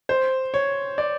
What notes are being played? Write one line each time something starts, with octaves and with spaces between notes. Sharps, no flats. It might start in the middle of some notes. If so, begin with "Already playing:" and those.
C5
C#5
D5